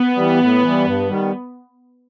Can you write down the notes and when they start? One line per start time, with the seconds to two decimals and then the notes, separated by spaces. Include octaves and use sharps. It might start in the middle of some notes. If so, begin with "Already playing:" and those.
Already playing: B3
0.16 E3 G3
0.40 A2
0.62 E3 G3
0.85 G2
1.09 D#3 G3